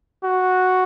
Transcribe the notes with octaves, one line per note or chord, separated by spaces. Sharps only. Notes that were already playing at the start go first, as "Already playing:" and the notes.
F#4